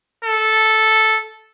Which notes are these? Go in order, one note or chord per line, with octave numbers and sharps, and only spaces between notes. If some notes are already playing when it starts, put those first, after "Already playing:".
A4